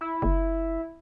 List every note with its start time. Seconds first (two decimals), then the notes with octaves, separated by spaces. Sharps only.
0.01 E4
0.22 F#1